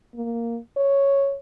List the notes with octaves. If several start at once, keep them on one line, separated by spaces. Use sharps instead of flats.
A#3
C#5